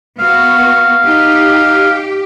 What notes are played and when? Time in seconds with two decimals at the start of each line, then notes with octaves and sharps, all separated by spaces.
0.18 B3 F#4 F5
1.05 D#4 G4